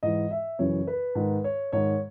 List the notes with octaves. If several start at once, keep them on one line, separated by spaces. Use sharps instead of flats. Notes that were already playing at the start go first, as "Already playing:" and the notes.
G#2 E3 D#5
E5
F#2 C#3 E3 C#5
B4
G#2 D#3
C#5
G#2 D#3 C#5